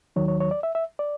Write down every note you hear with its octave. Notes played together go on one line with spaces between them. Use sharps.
D#2 D#3 F#3 C#5
C#5
C#5
D5
E5
E5
D5